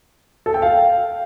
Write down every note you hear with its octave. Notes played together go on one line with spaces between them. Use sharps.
A4
G5
F5